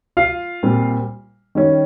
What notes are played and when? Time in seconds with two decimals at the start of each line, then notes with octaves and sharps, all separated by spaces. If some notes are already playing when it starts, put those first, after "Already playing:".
0.17 F4 F5
0.63 A#2 G3 C4
1.55 D#3 G3 C#4